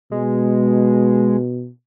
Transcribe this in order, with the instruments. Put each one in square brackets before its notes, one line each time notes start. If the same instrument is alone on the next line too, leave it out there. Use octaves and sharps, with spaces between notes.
[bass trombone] B2 [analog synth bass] G#3